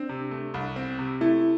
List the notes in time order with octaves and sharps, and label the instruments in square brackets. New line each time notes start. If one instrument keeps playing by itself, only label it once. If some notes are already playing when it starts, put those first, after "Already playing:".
Already playing: [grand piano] C4 [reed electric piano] D4
[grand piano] C3
A3
C2
C4
C3
[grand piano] A3 [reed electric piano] E4